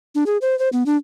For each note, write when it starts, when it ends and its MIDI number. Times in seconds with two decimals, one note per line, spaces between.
0.15 0.24 62
0.26 0.37 68
0.41 0.57 72
0.59 0.69 72
0.73 0.83 59
0.86 0.96 62